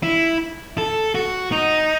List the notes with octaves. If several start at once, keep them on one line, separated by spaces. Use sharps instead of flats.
E4
A4
F#4
D#4